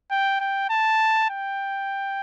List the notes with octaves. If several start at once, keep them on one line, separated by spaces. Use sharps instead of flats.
G5
G5
A5
G5